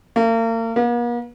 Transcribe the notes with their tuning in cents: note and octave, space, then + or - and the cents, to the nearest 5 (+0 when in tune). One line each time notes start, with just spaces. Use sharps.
A#3 -40
A#3 +45